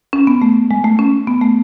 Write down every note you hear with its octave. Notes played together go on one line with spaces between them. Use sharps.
C#4
B3
A3
G#3
A3
C#4
B3
A3